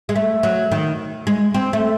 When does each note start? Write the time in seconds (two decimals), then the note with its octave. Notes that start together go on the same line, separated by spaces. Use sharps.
0.09 G#3
0.15 A3
0.43 F#3
0.72 D#3
1.27 G#3
1.54 C4
1.73 A3